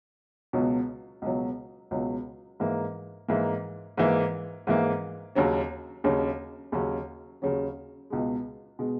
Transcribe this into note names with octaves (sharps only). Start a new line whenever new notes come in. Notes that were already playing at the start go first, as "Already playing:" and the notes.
C#2 B2 F#3
C#2 B2 F#3
C#2 B2 F#3
G#2 E3 A#3
G#2 E3 A#3
G#2 E3 A#3
G#2 E3 A#3
D#2 C#3 F#3 C#4
D#2 C#3 F#3 C#4
D#2 C#3 F#3 C#4
D#2 C#3 F#3 C#4
C#2 B2 G#3
B2 G#3